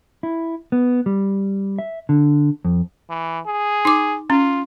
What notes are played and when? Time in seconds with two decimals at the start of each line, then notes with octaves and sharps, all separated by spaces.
0.23 E4
0.72 B3
1.06 G3
1.79 E5
2.09 D3
2.65 F2
3.10 E3
3.46 G#4
3.85 D#4 D6
4.30 C#4 F4